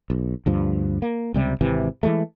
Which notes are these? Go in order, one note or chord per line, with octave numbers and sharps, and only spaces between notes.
B1
D2 G2 F3
A#3
C#2 C3 G3
G#1 C3 E3
E3 F3 G#3 A3